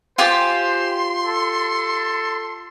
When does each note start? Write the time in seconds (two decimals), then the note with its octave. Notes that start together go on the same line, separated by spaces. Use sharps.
0.18 F4 G4 C5 G#5 C6
1.24 A4